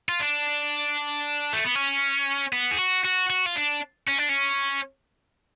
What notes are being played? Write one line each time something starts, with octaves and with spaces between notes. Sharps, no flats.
F4
D4
A3
B3
C#4
B3
G#4
F#4
F#4
F#4
F4
D4
C#4
D4
C#4